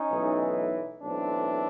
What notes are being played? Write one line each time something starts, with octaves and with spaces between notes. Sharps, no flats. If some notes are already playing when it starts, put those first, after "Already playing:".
Already playing: C#4 D#4
B1 A2 E3
B1 A2 E3 C4 D4